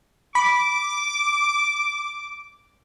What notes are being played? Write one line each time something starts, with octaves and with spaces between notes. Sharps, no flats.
B5 D6